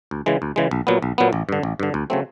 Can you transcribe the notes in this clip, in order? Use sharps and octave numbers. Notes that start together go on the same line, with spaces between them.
D2
C#3 E3 G#3
D2
C#3 E3 G#3
B1
A#2 F#3 B3
B1
A#2 F#3 B3
A1
G2 D3
A1
G2 D3
D2
C#3 F#3 A3 C4